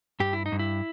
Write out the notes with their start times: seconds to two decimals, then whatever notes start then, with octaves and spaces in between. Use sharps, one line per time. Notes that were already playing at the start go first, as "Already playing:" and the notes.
0.20 G2 G4
0.33 E4
0.46 D#4
0.52 G2
0.59 E4